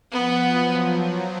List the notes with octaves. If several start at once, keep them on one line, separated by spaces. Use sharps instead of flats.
F3 B3
F#3